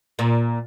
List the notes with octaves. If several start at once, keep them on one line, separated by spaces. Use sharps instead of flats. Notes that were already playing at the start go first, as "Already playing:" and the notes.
A#2